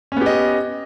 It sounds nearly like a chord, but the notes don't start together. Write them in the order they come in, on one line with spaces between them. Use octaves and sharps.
C#4 B3 G4 D#5